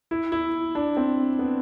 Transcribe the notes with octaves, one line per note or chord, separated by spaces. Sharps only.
E4
E4
D4
C4
B3